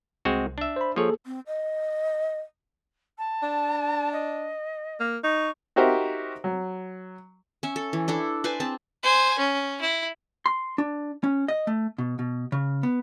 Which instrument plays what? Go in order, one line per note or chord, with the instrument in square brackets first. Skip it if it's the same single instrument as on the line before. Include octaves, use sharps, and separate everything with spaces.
[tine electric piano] C2 [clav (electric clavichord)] G#3 C4 F#4
[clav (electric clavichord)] D4 E5
[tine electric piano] C5 B5
[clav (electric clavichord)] F3 C#5 [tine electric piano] A#3 G#4 A4
[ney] C4
D#5
[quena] A5
[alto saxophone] D4
[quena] D#5
[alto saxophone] A#3
[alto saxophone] D#4 [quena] C#6
[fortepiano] D#4 F#4 G4 A#4 C5 E5
F#3
[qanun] C#4 E5
A4
E3
D4 E4 A4
B4 C5 D5 G#5
C4 G#4 A5
[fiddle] C5 G#5
C#4
E4
[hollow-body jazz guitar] C6
D4
C#4
D#5
A3
B2
B2
C#3
B3